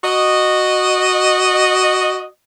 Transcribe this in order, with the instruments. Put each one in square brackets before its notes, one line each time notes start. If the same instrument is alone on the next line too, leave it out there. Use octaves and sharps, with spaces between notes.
[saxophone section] F#4 D#5